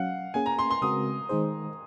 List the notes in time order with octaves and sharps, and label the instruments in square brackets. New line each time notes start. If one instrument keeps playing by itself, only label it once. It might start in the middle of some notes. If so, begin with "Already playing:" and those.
Already playing: [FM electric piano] F#3 C#4 [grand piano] F5 F#5
[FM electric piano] A#3 C#4 G#4 [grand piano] G#5
[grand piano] A#5
C6
C6
[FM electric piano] C#3 G#3 C4 F#4 A#4 [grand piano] D#6
[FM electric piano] D#3 G#3 D#4 G#4 C5